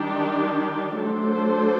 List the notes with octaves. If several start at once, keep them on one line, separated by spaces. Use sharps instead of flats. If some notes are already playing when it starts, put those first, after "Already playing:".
Already playing: D#3 G3 D4 G4
F#3 A3 D4 A4 C5